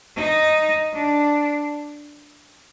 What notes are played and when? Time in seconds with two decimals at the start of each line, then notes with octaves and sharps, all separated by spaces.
0.16 D#4
0.93 D4